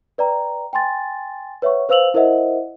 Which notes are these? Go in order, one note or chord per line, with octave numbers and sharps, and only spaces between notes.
B4 D5 G5 A#5
G5 G#5 C6 A6
B4 C#5 E5 F#5 C#6
B4 C5 F5 E6 F7 F#7
E4 A#4 C5 D#5 E5 F#5